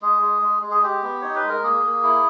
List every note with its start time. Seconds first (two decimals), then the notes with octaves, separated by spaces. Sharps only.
0.02 G#3 G#4
0.22 G#3
0.42 G#3
0.62 G#3
0.71 G#4
0.83 G#3 G4
1.03 B3
1.21 D#4 C#5
1.35 B4
1.43 G#3
1.49 A#4
1.63 A#3 G#4
1.83 A#3
2.03 E4